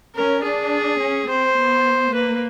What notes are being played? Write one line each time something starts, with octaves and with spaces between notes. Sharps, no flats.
C#4 A#4
D4 G#4
C#4
C4 C5
B3
A#3 B4